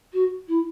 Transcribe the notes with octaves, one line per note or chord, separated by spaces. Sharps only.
F#4
E4